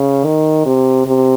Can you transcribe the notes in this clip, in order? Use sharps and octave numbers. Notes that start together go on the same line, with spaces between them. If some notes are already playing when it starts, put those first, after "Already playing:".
Already playing: C#3
D#3
C3
C3